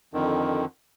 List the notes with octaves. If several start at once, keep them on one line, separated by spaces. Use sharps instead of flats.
F2 D3 D#3